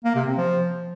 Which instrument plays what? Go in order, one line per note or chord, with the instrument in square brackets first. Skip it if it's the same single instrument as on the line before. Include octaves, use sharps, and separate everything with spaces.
[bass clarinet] A#3
C3
C4
F3